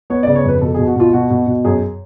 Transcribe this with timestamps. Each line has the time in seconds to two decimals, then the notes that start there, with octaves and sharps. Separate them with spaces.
0.10 B3 C#5
0.23 C#3 D5
0.35 C#5
0.44 F2 B4
0.61 B2 A4
0.74 B2 G#4
0.87 F#4
0.96 B2 F4
1.13 B2 F#4
1.30 B2
1.47 B2
1.65 F#2 G#4